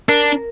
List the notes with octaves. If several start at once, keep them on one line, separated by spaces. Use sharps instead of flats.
D4 A#4